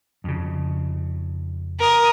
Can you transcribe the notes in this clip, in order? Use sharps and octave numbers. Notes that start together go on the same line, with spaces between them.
F2 C#3
A#4 D#6